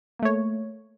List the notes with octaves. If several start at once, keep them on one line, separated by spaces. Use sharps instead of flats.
A3 A#3 C#5